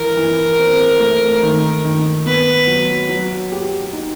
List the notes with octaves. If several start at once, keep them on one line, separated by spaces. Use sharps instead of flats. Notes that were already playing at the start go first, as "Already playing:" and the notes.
Already playing: E3 A#4
E3
C4
A3
D#3
D#3
B3 B4
F#3
F#3
G4
D#4